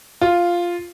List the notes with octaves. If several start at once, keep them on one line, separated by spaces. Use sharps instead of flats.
F4